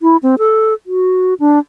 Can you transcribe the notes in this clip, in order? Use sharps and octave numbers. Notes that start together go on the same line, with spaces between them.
E4
C4
A4
F#4
D4